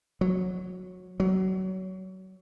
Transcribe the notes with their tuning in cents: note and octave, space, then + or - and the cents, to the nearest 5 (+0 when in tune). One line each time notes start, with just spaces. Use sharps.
F#3 -15
F#3 +25